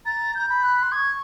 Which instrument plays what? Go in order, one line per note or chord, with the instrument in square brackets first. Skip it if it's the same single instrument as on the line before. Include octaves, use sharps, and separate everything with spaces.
[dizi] A#5 [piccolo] A6
[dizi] A#5 [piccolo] G6
[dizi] B5
[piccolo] F#6
[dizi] C6
[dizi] D#6 [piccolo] G#6
[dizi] C#6